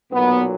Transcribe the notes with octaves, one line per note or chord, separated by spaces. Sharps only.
B1 A#2 F#3 B3